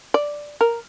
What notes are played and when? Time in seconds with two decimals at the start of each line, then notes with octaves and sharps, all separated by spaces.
0.14 D5
0.61 A#4